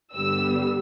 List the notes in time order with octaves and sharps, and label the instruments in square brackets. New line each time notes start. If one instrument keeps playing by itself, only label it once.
[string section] G2 D3 G3 B3 E6